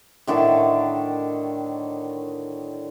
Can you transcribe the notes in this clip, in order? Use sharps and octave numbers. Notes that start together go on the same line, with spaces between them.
A2 D3 D#3 A5